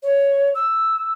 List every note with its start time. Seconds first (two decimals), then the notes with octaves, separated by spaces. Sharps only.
0.03 C#5
0.55 E6